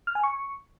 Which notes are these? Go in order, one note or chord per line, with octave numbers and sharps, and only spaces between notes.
F6
G#5
C#6